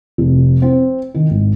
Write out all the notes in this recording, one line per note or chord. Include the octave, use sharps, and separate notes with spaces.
F1
C4
D#3
G#1